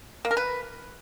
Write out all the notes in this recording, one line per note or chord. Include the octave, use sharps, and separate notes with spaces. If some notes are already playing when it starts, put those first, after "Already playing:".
A#3
A#4
B4